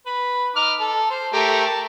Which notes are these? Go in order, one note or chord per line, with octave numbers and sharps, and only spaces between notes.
B4
D#4 D6 F6
A4
C5
A3 G4 A#4
A5